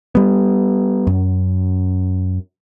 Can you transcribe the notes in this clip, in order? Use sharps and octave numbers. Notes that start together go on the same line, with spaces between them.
G3 B3
F#2